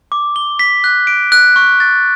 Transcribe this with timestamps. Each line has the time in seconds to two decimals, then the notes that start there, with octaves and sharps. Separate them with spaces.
0.12 D6
0.36 G7
0.59 B6
0.84 F#6
1.07 D7
1.32 F#6
1.56 C#6
1.80 A6